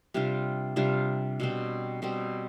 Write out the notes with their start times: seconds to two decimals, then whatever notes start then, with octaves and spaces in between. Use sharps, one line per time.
0.14 C3 G3 D4 F4
0.76 C3 G3 D4 F4
1.40 B2 G3 C4
2.02 B2 G3 C4